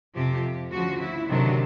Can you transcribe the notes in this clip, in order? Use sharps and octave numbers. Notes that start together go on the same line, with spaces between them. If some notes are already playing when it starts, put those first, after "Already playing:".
F2 C3 F3 G4
D2 C#3 F3 F#4
E4
D2 C3 D#3 F#3 D4